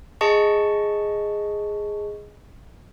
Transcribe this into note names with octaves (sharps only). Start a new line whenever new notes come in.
G#4 D#5 A5 C#6